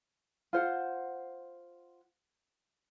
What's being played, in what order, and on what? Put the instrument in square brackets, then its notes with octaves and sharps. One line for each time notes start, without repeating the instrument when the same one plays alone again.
[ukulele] F4 C5 F#5